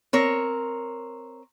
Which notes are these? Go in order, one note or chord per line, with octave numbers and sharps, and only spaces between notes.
C4 A#4 C#5